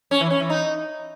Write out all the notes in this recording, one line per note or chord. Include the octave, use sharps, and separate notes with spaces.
C#4
E3
C#4
E3
D#4